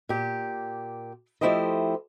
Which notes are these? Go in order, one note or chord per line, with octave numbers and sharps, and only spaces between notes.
A#2 G4
F3 A3 E4 G4 C5 D#5